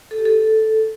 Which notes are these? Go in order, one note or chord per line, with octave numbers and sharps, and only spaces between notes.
A4
G4
A4